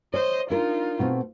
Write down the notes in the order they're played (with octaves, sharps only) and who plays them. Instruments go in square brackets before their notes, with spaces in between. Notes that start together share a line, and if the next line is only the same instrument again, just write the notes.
[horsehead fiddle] C5 D#5 [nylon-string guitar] C#5
[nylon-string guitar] D4 A#4 [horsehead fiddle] D#4 F4
[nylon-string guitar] B2 A3 C4